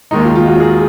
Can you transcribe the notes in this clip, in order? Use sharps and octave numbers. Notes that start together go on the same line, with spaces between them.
D#2 D#3 G#3 D#4
F4
F4
F#4
G#4